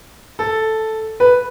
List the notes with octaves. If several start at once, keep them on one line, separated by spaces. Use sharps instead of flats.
A4
B4